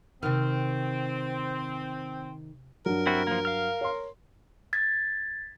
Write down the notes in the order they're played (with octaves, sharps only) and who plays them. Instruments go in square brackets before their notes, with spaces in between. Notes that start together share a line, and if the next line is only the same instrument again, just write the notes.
[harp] C3 F6 [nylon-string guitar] D#3 [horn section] C4
[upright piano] G2 F#3 [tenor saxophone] A#4
[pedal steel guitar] C4 E4 F#4
F3 A#3
F5 F6
[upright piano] C#5 C6
[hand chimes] G#6 A6 B6